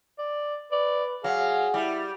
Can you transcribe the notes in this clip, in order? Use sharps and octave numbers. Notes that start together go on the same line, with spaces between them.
D5
B4 D5
F#3 G#4 F5
G3 E4